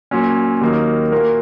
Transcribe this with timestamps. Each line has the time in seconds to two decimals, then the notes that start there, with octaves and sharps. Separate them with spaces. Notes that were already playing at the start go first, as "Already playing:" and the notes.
0.11 A#2 F#3 C#4
0.61 D#2 D#3 F#3 A#3 D#4
1.12 A#2 A#3 F#4 A#4